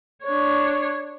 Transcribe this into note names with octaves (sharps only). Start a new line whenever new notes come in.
D4 C#5